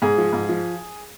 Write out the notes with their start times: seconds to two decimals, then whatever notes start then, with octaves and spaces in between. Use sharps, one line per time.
0.02 G#2 G#4
0.18 F3
0.33 G#2
0.49 F3